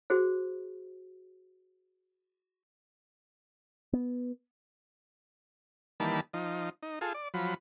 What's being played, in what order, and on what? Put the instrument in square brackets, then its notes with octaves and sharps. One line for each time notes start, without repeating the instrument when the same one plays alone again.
[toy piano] F#4 G#4 C5
[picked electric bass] B3
[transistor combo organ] D#3 E3 G3 A#3 A5 B5
F3 D#4
D#4
F4 G#4 A4
D5
F3 F#3 B5